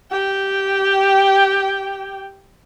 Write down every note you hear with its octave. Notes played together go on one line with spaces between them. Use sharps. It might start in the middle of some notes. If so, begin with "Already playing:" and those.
G4 G5